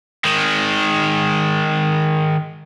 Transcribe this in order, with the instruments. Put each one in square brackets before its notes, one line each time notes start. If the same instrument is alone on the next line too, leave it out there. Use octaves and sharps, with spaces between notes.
[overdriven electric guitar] D#3 G#3